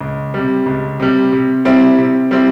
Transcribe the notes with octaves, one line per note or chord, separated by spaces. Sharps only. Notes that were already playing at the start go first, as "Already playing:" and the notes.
C#2
C3 G3
C#2
C3 G3
C3
G3 C4 E4
C3
G3 C4 E4